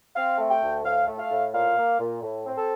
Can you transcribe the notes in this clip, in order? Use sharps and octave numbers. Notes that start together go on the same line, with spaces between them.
C4 F5
A3
G5
D2
A2 F5
A3
F5
A2
A#2 F5
A#3
A#2
A2
C4
A4